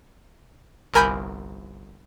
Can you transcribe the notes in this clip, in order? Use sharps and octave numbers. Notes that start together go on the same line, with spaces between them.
G1 C2 A#4 G#5 B5 G6